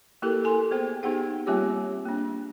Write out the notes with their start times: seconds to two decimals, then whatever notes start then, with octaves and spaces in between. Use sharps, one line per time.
0.22 A#3 E4 G4 A4 A#4
0.44 A4 G#5 C6
0.71 B3 G#4 C5 G5
1.03 B3 D#4 G4 G#4 F#5 G5
1.47 G3 A#3 C4 F4 G4 C#5
2.06 A#3 D4